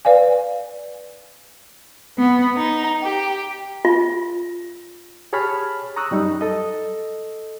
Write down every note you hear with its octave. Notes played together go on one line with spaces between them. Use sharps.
B4 D5 F5 G#5
B3
D#4
G4
F4
G4 G#4 C#5 A5 B5 F6
A#5 C#6 D#6 E6 F#6
F#2 G3 D#4
A4 D#5